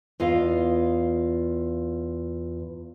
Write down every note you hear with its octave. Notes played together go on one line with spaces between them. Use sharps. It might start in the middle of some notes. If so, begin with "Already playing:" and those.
E2 F4 D#5 F5